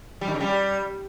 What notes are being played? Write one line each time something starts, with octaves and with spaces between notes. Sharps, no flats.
G3
D#3
C#3
G3